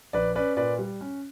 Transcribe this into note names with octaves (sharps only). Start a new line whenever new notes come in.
A#1 B4 D5
C#4 B4 D5
A#2 B4 D5
G3
C#4